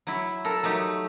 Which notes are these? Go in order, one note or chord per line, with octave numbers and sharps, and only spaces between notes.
F#3 E4
A4 A#4
F#3 A3 D#4 G4